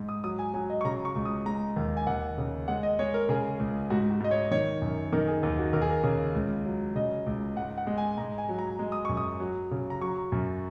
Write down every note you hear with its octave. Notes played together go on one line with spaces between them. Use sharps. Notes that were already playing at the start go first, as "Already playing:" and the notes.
Already playing: G#2
D#6
F#3 D#6
G#5
F#3 G#5
D#5
C#6
C#3 A#5
C#6
C#2
D#6
G#3 A#5
D#2
G#5
D#2 F#5
C#3
G#3 F#5
D#5
G#3 C#5
A#4
C#3 G#4
C#2
G#2 F#4
F#4
G#2 D#5
C#5
D#3 C#5
F#2
D#3 A#4
G#4
D#2 D#4
F#4
D#2 A#4
G#4
A#4
C#3
C#2
F#3
C#3 D#5
C#2
G#2 F#5
F#5
G#3
G#5
G#2 A#5
G#5
F#3
A#5
G#3
D#6
F#2 C#6
D#6
F#3
C#3
A#5
F#3 C#6
F#2